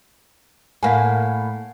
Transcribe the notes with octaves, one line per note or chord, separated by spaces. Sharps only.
A2 A#3 F5 F#5 G#5